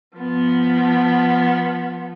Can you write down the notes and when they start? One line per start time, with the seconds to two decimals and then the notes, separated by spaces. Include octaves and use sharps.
0.17 F3 B3